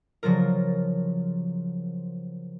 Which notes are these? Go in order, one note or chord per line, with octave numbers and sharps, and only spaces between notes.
C#3 F3 F#3 F4 A#4